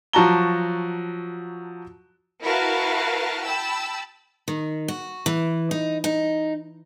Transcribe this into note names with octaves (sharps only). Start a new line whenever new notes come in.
F3 F#3 F#4 A5 A#5 G7
E4 F#4 A#4 B4 F5 A5
G5 A5 B5 E6
D#3
F#4
E3
D#4
D#4